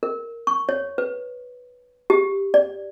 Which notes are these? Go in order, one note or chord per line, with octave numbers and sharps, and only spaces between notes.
A#4
C#6
C#5
B4
G4
D5